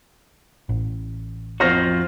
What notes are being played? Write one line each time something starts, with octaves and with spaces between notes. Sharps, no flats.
A1
F2 F4 F#4 C5 F6 A#6